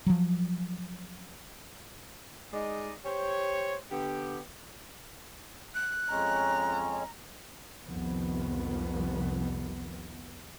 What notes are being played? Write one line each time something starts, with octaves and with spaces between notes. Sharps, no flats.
F3 F#3
G#3 D#4 D5 D#5
G4 C5 C#5
D3 B3 G4
F#6
F2 G#3 C#4 A#5
C2 F2 C3 D#3 F3 B3